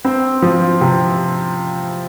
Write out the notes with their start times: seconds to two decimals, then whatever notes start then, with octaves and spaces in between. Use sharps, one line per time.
0.05 C4
0.42 F3
0.81 C3